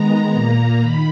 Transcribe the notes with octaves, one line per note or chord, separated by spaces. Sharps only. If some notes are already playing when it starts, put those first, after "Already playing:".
Already playing: D#3 G#3 B3 A#5
A#2 A#3
D#3 B5